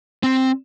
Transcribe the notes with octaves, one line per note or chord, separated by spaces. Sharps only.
C4